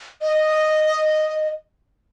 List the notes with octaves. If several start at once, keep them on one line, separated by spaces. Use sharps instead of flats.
D#5